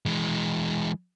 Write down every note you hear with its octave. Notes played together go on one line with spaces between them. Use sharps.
E3 G#3